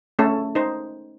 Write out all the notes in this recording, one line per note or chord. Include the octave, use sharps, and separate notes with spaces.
A3 C#4 A4
D#4 C5